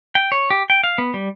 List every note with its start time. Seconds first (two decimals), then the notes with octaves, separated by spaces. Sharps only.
0.15 G5
0.32 C#5
0.50 G4
0.70 G5
0.84 F5
0.98 B3
1.14 G3